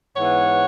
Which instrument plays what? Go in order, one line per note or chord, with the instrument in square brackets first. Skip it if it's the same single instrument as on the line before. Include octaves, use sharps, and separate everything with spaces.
[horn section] G#2 E3 B3 C#5 F#5